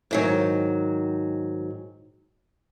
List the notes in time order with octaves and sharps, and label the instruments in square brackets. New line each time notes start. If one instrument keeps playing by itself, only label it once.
[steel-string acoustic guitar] G#2 D#3 F#3